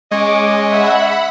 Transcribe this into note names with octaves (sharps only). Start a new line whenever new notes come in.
G#3 C#4 C#5 D#5 D6
E5 F#5 B5